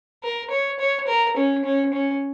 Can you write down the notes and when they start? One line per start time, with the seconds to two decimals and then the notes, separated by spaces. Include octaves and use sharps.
0.23 A#4
0.50 C#5
0.79 C#5
1.07 A#4
1.37 C#4
1.64 C#4
1.93 C#4